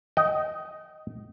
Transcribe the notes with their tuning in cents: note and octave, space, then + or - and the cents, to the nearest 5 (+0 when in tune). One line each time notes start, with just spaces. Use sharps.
D#5 +0 G5 -35